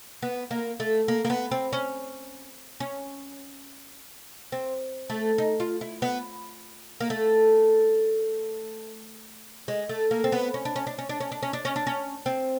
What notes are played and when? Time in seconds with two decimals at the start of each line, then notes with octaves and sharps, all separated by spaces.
0.22 B3
0.51 A#3
0.80 A3
1.08 A#3
1.25 A#3
1.30 B3
1.51 C4
1.73 C#4
2.80 C#4
4.52 C4
5.10 A3
5.38 D#4
5.60 F4
5.81 E4
6.02 B3
7.00 A#3
7.10 A3
9.68 G#3
9.89 A3
10.11 A#3
10.24 C4
10.32 B3
10.54 C#4
10.65 D4
10.76 C#4
10.87 D4
10.98 C#4
11.09 D4
11.20 C#4
11.32 D4
11.43 C#4
11.53 D4
11.65 C#4
11.76 D4
11.87 C#4
12.26 C4